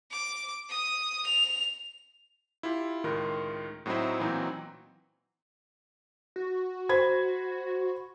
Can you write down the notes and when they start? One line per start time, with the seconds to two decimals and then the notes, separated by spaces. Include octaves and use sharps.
0.11 D6
0.70 D#6
1.27 F7
2.63 E4 F4 G4
3.04 C#2 A2 D#3 F4 A#4 C6
3.86 A2 F#3 C4 D#4 E4
4.20 A#2 E3 F#3 C4 D#4
6.36 F#4
6.89 C5 B5 G#6